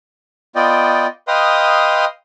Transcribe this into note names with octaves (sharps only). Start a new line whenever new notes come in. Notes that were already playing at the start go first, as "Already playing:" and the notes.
B3 F4 D5 D#5 G5
B4 D#5 F5 G5 C6 D#6